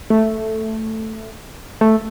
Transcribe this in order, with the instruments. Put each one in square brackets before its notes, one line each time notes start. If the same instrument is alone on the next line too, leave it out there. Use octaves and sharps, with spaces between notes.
[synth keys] A3
A3